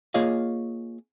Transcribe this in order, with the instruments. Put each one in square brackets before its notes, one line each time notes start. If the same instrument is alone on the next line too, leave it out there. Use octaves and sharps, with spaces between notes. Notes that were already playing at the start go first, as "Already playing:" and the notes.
[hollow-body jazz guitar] A#3 F4 G#4 C#5 D#5 F5